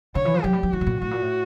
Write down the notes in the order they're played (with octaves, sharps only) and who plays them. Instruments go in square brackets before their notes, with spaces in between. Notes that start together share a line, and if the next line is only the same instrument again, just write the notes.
[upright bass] D3 [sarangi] C#5
[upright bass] E3
F3
[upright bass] F#3 [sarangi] G4
[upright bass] G3
F#3
[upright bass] E3 [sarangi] F#4
[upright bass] A2
A#2
[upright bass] A2 [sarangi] F#4
[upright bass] A#2
A2